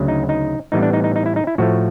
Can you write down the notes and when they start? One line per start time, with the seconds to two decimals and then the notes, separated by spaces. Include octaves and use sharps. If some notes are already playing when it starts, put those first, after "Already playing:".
Already playing: D2 C#3 F#3
0.08 D#4
0.29 D#4
0.72 A2 E3 G3 B3 D#4
0.83 D4
0.93 D#4
1.04 D#4
1.16 D#4
1.26 E4
1.36 D#4
1.47 E4
1.58 A2 F3 A3 F#4